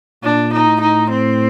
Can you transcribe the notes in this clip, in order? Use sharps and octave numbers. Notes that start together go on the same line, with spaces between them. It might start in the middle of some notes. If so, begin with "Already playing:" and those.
A#2 D4
D#4
A2
D#4
C4